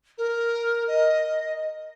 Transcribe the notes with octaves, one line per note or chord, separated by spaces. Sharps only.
A#4
D#5